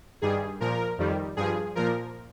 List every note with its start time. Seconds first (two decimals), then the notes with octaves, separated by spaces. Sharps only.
0.22 G2 D#3 G3 G#4
0.60 A#2 F3 A#4
0.98 F2 D#3 G3
1.37 G2 F3 G#4
1.75 A#2 F3 A#4